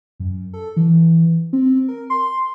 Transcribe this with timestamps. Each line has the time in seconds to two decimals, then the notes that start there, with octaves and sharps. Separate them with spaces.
0.20 F#2
0.53 A4
0.77 E3
1.53 C4
1.88 A#4
2.10 C6